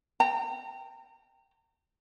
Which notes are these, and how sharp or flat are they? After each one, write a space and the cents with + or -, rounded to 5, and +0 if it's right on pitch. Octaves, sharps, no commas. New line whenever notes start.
G5 +0 A#5 -35